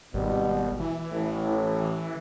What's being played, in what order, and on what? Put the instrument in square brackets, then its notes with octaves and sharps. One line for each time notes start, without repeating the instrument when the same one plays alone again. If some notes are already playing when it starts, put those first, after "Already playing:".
[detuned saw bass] G#1 [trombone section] B2 G3
[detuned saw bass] E3
[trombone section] A1 A2